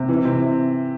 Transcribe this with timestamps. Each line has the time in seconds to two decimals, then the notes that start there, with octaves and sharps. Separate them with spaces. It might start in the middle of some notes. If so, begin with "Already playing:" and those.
Already playing: C3
0.09 E3
0.25 C3